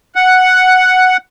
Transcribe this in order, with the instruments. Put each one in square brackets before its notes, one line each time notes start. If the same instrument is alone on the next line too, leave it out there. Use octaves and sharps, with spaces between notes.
[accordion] F#5